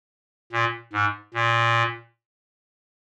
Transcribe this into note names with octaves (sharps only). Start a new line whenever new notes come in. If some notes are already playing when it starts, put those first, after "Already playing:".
A#2
G#2
A#2